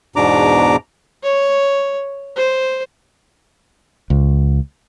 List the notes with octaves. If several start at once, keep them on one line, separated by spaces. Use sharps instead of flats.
E2 G#2 B2 D4 A#5 D6
C#5
C5
C#2